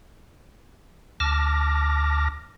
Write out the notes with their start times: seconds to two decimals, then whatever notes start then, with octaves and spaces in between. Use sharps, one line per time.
1.20 D2 A5 D6 F6 A#6